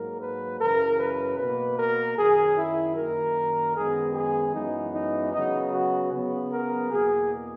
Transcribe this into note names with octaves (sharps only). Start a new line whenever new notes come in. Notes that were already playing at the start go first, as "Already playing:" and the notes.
Already playing: G#2 F#3 A#3 A#4
B4
F#2 C#3 E3 A#4
B4
B2 A#3 B4
A#4
F#2 D#3 F#3 G#4
E4
F#2 D#3 A#3 A#4
F#2 D#3 G#3 B3 G#4
G#4
F#2 E3 G#3 B3 D#4
D#4
C#3 F#3 B3 D#4
F#4
C#3 F#3 B3
A#4
E2 B2 A#3 G#4